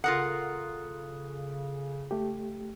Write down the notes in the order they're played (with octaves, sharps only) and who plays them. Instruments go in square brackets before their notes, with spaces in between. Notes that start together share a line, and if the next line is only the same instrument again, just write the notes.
[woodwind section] C#3 [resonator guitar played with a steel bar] F4 A#4 F#5 [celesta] A4 D#6 F#6
[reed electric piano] A3 G4